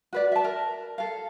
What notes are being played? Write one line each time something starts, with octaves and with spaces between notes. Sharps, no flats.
F#4 B4 D5
E5 A5
A#4
A4 F5